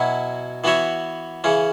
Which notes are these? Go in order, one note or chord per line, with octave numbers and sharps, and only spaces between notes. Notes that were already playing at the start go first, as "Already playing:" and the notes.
Already playing: B2 F#3 C#4 E4
E3 B3 F#4 C#5 E5
C#3 E3 C#4